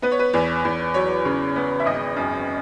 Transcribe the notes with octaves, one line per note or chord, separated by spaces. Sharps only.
B3 B4
C#5
B4
E2
E2
F#3 C#5
C#3
B3
E5
G#1 D#5
F#2